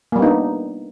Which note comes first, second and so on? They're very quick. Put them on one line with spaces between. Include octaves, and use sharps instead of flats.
A#3 G3 B3 D#4 D4